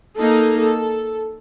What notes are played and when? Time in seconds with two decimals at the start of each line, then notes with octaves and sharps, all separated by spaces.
0.18 A#3 D#4 A4
0.60 A4